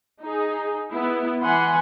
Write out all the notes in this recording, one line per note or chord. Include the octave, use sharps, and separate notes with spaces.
D#4 G#4
B3 E4
E3 F#5 G#5 B5 C6